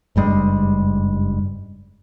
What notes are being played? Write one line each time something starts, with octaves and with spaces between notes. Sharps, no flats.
F#1 G2 G3 G#3